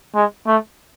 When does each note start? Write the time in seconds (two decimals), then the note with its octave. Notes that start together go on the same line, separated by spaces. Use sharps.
0.15 G#3
0.47 A3